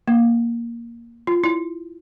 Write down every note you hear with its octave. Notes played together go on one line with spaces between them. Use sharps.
A#3
F4
E4